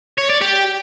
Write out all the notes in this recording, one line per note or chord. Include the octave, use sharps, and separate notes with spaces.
C#5
D5
G4